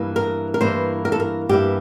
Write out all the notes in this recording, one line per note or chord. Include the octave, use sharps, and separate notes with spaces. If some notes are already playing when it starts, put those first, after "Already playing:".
Already playing: G2 E3 A#3 E4
A#4
A#4
G2 E3 A#3 E4 C5
A#4
A4
A#4
G2 E3 A#3 E4 G4